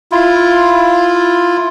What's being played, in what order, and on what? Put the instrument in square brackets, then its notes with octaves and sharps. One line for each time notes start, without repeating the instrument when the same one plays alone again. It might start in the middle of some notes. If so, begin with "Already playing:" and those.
[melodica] E4 F4